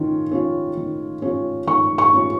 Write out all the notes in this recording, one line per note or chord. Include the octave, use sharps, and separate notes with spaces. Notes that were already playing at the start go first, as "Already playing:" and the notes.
Already playing: D#3 C#4 F4
C#4 F4
D#3
C#4 F4
D#3 C#6
C#6
C#4 F4